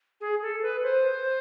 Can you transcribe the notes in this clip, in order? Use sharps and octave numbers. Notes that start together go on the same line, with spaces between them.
G#4
A4
B4
C5